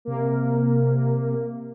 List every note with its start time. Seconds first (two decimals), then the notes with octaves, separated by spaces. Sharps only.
0.05 C3 A#3